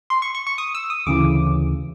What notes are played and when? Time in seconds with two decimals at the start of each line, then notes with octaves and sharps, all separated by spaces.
0.10 C6
0.22 C#6
0.35 C#6
0.47 C#6
0.58 D#6
0.75 E6
0.90 D#6
1.06 D2 C#3 E3 D6